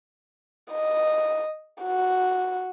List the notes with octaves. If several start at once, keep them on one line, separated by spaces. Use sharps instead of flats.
D#5
F#4